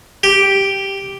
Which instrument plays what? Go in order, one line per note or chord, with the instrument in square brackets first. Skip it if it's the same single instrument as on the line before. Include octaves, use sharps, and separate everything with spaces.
[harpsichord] G4